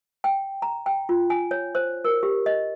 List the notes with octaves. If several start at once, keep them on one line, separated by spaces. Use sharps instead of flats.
G5
A#5
G5
F4
G#5
C#5
C5
A#4
G4
D#5